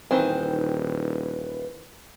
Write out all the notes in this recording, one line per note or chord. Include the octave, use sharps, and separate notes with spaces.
D#1 D#3 E3 C4 B4